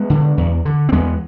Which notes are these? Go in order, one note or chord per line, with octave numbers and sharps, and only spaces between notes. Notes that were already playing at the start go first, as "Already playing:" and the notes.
Already playing: G#3 B3
D3
E2
D3
C4
E2 G#3 B3